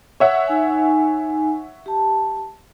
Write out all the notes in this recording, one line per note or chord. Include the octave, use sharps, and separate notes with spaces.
C#5 E5 F#5
D#4 G#5
G4 A5